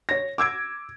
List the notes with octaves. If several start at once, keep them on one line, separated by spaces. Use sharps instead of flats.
C#5 A#6
D6 E6 G#6 D7